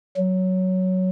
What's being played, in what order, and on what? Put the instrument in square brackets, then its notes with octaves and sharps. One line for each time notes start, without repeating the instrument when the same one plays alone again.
[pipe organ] F#3